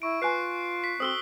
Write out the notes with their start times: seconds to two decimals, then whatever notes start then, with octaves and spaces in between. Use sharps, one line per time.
0.02 E4 C#6 D7
0.22 F4 B4 G#5 C#6 F#6 C7
0.84 B6
1.00 C4 F#4 A4 C5 D#6 E6 G7